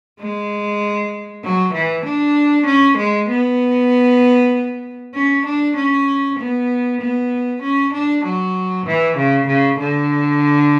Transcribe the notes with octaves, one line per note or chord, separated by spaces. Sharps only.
G#3
F#3
E3
D4
C#4
G#3
B3
C#4
D4
C#4
B3
B3
C#4
D4
F#3
E3
C#3
C#3
D3